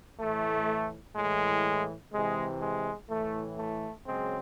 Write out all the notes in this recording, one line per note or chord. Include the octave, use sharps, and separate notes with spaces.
A2 E3 A3
A2 E3 G#3
C3 E3 G#3
G#3
A2 E3 A3
A3
C#3 F#3 G#3 C4